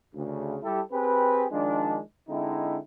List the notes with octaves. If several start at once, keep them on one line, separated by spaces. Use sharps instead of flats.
D2 C#3
G3 E4 G4 A4
C4 G4 G#4 B4
D#3 F3 G#3 D4
D3 G#3 C4 D#4 E4